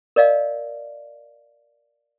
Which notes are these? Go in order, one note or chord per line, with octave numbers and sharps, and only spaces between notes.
A#4 D5 D#5 F5